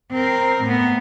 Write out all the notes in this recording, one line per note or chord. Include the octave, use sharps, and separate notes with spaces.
C4 A#4
A2 B3